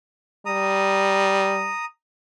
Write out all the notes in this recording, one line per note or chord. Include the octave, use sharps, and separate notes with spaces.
G3 A#5 D#6